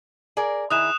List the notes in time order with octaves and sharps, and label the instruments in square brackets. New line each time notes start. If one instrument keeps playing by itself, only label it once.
[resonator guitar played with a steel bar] G#4 A#4 D5
[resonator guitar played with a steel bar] D#3 E4 G#4 [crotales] D#6 F#6 E7